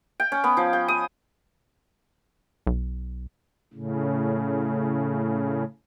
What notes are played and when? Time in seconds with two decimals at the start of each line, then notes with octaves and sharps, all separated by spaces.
0.20 G5
0.32 C#4
0.44 B3
0.57 F3
0.73 G5
0.88 D#6
2.67 B1
3.74 A2 C#3